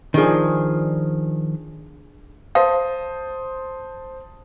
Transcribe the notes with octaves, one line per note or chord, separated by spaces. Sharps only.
D#3 F3 D4 G#4
C5 F5 A5 D#6